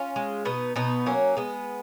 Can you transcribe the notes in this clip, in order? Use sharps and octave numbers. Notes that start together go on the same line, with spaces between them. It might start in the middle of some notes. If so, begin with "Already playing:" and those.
Already playing: C#4 F4
G#3
B2 B3 D#4
B2 B3 D#4
F#3 A#3 C#4
G#3 B3